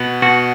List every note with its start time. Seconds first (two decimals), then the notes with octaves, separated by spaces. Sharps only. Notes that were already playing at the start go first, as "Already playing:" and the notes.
Already playing: B2 B3
0.22 B2 F#4